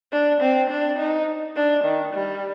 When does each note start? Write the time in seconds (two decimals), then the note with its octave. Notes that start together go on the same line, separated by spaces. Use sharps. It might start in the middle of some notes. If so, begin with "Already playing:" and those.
0.12 D4
0.41 C4
0.70 D4
0.99 D#4
1.56 D4
1.85 D#3
2.14 G3